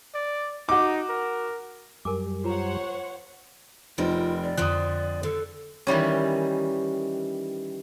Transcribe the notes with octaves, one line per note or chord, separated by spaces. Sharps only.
D5
D#4 F#4 D6
A#4
F#2 G3 A#4 G#5 D6
F4 C5 C#5 F#5 A#5
F1 C4 D#4 F4 A#4 B4
D5
F2 D3 F3 D#6 F#6
D3 A4
D#3 E3 G3 C#4